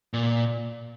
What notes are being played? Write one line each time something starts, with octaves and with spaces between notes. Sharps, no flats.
A#2